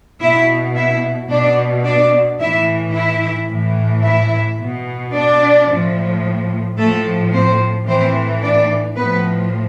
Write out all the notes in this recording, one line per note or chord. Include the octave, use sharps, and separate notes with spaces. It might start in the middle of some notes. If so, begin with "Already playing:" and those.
B2 E4 E5
E4 E5
B2 D4 D5
D4 D5
A2 E3 E4 E5
E4 E5
A2 E3
E4 E5
B2
D4 D5
A2 F3
A2 F3 A3 A4
C4 C5
A2 E3 C4 C5
D4 D5
A2 F3 B3 B4